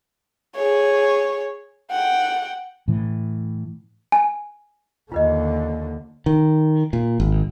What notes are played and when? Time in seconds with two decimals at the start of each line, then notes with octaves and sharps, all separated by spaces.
0.56 G#4 C#5
1.91 F#5 G5
2.88 A2 E3
4.12 G#5
5.12 D#2 D3 F4 B4 D#5
6.26 D#3
6.93 A#2
7.20 G#1